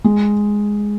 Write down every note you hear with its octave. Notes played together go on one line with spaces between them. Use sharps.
G#3